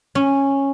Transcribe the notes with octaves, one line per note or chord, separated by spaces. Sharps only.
C#4